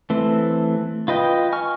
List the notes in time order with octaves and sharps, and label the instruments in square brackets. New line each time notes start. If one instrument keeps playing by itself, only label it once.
[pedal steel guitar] E3 A3 C4
F4 B4 D#5 G5
G#5 C#6 F6